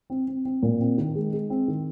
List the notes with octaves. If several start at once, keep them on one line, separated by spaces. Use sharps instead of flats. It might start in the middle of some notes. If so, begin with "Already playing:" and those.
C4
C4
C4
A#2
C4
D#3
G#3
G#3
C4
D#3